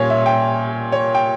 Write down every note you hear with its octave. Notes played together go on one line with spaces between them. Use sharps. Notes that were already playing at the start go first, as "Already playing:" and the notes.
Already playing: A#2 G3 A#3 C#4 C#5 G#5
E5
G5
C#5
G5